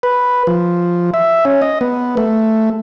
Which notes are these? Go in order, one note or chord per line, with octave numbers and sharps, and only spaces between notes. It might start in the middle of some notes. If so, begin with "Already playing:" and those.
B4
F3
E5
C#4
D#5
B3
A3